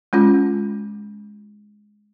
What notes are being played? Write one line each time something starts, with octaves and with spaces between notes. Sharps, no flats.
G#3 C#4 F4